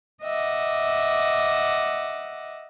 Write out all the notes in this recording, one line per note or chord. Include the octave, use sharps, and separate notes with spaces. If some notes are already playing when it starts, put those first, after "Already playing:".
D#5 E5 F#5 D6